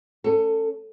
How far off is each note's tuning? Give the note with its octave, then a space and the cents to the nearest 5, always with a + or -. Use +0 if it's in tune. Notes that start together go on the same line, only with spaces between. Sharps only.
C#4 +0 A4 +25